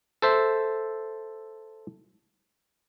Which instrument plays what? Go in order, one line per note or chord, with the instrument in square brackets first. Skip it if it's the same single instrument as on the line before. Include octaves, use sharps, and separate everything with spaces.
[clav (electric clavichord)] A4 C5 E5